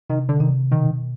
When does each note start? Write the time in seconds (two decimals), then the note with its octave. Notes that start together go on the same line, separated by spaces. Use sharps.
0.10 C3 D#3
0.29 D3
0.40 C3 D#3
0.71 B2 D#3